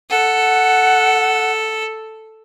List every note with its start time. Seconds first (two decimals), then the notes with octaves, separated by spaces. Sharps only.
0.10 A4 F#5